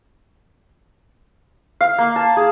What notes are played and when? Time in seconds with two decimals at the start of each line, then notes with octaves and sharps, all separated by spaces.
1.81 F5
1.98 A#3
2.16 A5
2.37 G#4